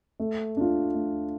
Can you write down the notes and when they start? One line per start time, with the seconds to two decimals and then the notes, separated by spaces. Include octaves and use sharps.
0.20 A3
0.57 D4 F4
0.94 A3